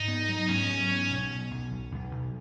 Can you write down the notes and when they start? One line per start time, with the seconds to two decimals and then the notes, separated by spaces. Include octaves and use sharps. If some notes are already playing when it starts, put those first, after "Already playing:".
Already playing: G#2 D#4
0.08 B3
0.29 F#3
0.49 G#2 C#4
0.69 F#3
0.90 B3
1.10 B1
1.31 B2
1.51 B1
1.71 B1
1.91 B1
2.11 B1